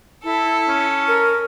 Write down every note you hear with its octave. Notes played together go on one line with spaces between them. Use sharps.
E4 A4
C#4
A#4